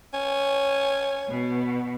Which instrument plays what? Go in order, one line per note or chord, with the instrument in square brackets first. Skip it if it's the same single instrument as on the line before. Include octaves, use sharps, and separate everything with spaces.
[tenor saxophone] C#4
[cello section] B2